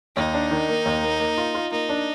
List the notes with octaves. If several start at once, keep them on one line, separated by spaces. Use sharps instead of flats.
D#2 D#4
D4
D#3
A#3
D#2
A#3
A#3
F4
F4
A#3 D#4
D4